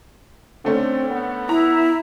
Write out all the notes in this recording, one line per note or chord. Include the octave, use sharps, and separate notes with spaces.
D3 A3 C4 C#4
B3
E4 A#5